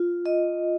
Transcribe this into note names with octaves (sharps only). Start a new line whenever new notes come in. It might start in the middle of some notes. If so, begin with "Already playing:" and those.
Already playing: F4
D#5